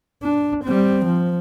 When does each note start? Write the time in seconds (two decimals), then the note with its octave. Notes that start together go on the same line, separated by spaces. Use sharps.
0.23 D4
0.65 G3 C4
1.06 F3